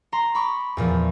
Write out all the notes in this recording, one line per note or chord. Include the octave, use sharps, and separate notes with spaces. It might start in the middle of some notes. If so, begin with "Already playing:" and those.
A#5 C6
B5 C#6 D6
E2 A#2 F3